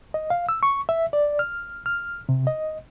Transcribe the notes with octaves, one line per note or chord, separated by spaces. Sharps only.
D#5
F5
E6
C#6
E5
D5
F6
F6
C3
D#5